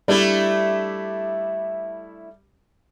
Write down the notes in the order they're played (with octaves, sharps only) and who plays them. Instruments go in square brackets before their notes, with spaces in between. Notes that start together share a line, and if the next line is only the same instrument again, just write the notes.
[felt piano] G3 [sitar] A3 D4 E4